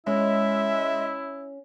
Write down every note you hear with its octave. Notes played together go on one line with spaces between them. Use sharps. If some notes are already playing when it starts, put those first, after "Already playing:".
G#3 C#4 E4 E5